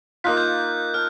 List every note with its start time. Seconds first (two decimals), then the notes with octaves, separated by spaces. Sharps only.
0.24 A#3 D#4 F4 F#6 B6
0.37 G6
0.94 A5 F6